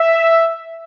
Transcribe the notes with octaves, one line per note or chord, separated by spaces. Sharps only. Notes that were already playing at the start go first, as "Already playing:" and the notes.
Already playing: E5